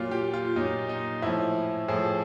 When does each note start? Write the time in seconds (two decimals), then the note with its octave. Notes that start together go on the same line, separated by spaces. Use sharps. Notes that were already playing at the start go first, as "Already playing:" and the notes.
Already playing: A#2 F#3 F4
0.11 G4
0.34 F4
0.56 A#2 F#3 D#4
0.89 D#4
1.22 A2 F3 E4
1.88 A2 F3 G#4